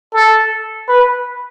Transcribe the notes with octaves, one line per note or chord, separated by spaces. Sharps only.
A4
B4